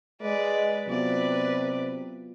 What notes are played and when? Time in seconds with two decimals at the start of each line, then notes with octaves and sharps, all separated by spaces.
0.22 G#3 B4 D5
0.88 C3 F#3 B3 F4 B4 D5